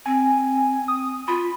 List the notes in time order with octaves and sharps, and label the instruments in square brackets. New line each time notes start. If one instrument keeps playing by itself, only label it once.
[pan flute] C4 [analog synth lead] G#5
[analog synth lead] D#6
[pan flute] F4 [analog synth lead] B5